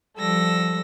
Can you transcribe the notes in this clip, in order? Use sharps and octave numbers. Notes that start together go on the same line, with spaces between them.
F3 G3 A4 E6 A#6